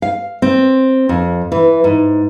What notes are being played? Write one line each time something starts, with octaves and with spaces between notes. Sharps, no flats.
F5
C4
F2
E3
G#2